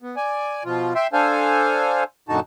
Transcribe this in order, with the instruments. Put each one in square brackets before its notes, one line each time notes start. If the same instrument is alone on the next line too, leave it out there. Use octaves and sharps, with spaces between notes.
[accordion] B3
D5 G#5
B2 F3 F4
E5 G5 C6
D4 A4 C5 F5 G#5
F#2 A#2 D3 D#4 F#4 A5